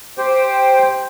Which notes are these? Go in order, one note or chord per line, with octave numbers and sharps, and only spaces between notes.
G4 C5 G5